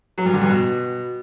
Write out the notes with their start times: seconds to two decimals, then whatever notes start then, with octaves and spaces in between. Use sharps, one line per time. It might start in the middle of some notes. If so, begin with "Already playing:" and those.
0.18 F#3
0.26 G2
0.33 D3
0.41 G2
0.49 B2